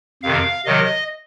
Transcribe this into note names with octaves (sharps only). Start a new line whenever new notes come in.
F2 C3 D#3 F5
C3 D#3 F#3 D#5